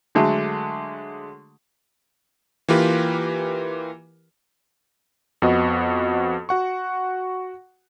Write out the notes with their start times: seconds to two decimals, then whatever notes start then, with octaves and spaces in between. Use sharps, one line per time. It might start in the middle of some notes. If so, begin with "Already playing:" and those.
0.15 D3 F#3 G#3 A3
2.68 E3 A#3 F4 G4 A#4 B4
5.42 F2 B3 F#4 D#5
6.49 F#4 F#5 C#6